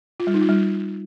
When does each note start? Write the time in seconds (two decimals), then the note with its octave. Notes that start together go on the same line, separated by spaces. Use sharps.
0.20 F4
0.27 G3
0.34 D#4
0.41 F4
0.49 G3